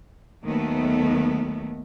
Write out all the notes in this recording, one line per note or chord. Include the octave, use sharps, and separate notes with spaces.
D#2 D#3 F#3 A3 B3